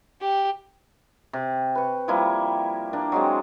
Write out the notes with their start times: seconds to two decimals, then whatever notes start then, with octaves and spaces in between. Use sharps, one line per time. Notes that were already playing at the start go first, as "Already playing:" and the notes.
0.21 G4
1.33 C3
1.75 B4 C#6
2.08 F3 G3 A#3 E4
2.93 A#3 D4
3.12 F#3 G#3 C4